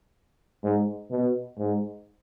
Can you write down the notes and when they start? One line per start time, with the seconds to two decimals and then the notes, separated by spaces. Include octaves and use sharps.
0.64 G#2
1.11 B2
1.59 G#2